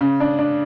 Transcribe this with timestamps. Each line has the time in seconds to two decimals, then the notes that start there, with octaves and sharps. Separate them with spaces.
0.01 C#3
0.20 D4
0.39 D4